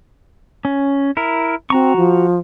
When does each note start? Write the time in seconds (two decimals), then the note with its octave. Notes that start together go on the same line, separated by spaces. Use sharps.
0.65 C#4
1.17 E4 A#4
1.70 C4 F#4 A#5 C#6
1.97 F3